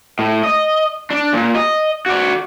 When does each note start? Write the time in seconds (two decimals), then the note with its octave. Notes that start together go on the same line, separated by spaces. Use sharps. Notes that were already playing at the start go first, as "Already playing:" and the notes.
0.19 A2
0.44 D#5
1.11 D4
1.33 A#2
1.55 D#5
2.06 F#4 D5